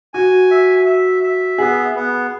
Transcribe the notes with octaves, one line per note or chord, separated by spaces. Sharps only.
F#4 G#5
E5
E5
E5
B3 G#4
B3